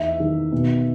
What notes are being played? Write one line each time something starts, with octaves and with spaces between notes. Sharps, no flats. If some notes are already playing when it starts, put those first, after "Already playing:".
Already playing: E2 D#4 E5
D#3
B2